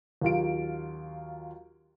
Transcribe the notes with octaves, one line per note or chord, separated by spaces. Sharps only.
D#2 F#3 F4 D7